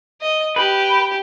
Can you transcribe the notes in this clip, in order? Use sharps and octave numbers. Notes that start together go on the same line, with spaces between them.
D#5
G4 B4